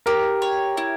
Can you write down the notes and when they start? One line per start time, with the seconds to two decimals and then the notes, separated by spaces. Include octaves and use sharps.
0.06 G4 A#4
0.42 C#5
0.77 E4